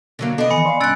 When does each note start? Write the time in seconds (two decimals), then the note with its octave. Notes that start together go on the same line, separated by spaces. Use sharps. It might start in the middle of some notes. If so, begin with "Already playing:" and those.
0.19 D3 F#3 A#3
0.38 B3 D4 A4 D#5
0.50 D#3 E3 G#5 B5 C#7
0.65 D5 D#5 F5 C6
0.81 G2 C#4 E6 F#6 A6 D7